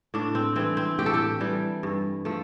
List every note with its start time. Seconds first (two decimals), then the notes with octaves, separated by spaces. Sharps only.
0.14 A2 D4
0.35 C4
0.56 E3 G3 C4
0.77 C4
0.99 A2 G4
1.06 A4
1.14 G4
1.40 E3 G3
1.83 G2
2.25 F3 A3